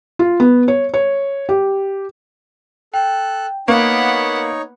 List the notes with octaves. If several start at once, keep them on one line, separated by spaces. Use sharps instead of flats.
F4
B3
C#5
C#5
G4
A4 G5 F#6
A#3 B3 D#4 C#5 F#5 C#6